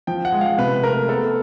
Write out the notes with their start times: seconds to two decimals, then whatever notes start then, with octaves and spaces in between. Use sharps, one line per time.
0.07 F3 G5
0.25 F#5
0.32 G#3
0.41 F5
0.58 C3 B4
0.83 A3 A#4
1.09 B3 A4